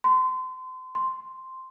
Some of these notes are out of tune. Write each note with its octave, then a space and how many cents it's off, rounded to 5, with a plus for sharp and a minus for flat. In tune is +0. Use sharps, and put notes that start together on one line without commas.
C6 -30
C6 +0